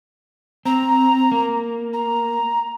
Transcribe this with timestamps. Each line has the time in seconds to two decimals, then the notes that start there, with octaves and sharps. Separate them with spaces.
0.65 C4 A#5
1.32 A#3
1.93 A#5